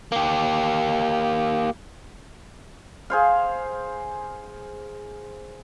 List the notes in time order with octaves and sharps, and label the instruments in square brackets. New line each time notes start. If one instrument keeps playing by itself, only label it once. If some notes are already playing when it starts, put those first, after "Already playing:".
[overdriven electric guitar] A#3 G4
[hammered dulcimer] G#4 C5 F5